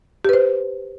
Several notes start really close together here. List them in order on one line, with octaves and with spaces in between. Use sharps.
G4 B4 C5